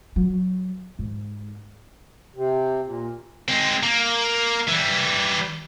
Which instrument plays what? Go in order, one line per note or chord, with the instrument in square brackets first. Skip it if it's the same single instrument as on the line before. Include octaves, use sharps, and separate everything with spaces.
[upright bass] F#3
G#2
[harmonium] C3
A#2
[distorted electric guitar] G#3 C4
A#3
E3 G3